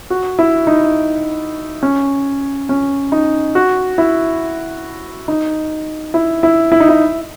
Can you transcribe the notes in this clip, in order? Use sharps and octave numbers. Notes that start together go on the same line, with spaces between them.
F#4
E4
D#4
C#4
C#4
D#4
F#4
E4
D#4
E4
E4
E4
D#4
E4